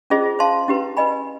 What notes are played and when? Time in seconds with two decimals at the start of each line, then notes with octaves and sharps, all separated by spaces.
0.10 C#4 F4 G#4 C5 D#5
0.39 C5 F5 A5 C6
0.68 C#4 E4 G4 B4
0.97 B4 D#5 G#5 B5